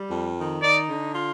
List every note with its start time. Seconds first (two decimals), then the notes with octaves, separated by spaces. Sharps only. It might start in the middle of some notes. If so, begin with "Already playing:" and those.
Already playing: G3
0.10 F2
0.37 D#3
0.62 D#4 D5
0.89 D3
1.15 F4